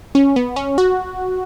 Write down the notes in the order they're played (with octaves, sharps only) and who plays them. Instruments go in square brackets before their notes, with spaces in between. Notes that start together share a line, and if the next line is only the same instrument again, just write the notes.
[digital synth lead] C#4
B3
C#4
F#4